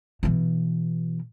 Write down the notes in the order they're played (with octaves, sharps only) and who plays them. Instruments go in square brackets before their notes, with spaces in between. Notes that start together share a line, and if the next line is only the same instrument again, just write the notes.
[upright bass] B2 E3